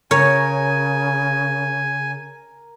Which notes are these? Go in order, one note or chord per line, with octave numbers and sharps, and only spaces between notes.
C#3 A#4 C#5 G#5